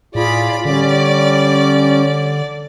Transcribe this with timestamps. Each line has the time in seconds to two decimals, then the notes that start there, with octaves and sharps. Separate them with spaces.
0.15 A2 F4 G#4 D5 B5
0.65 D3 G3 C#4 D5